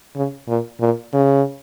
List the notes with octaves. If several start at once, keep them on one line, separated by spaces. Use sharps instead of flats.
C#3
A#2
A#2
C#3